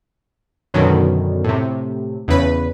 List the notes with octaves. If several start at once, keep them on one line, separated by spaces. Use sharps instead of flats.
F#2 B2 D3 D#3 F#3
A2 C3
E2 C#3 B4